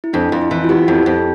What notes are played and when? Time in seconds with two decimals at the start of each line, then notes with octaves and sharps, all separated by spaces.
0.04 E4
0.13 F2 D4
0.32 F2
0.42 E4
0.51 E3
0.64 F4
0.69 B3 G4
0.88 F2
0.97 G4
1.06 F2